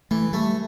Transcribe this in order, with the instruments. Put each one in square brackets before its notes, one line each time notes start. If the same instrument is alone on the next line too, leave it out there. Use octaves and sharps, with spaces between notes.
[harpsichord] E3 [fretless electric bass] A3
[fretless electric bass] G3 [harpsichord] A3